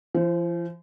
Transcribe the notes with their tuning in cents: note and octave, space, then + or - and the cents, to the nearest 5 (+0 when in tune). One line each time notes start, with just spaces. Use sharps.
F3 -45 C5 +0